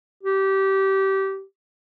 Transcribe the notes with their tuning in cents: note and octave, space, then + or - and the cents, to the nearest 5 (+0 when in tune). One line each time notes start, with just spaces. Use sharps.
G4 -20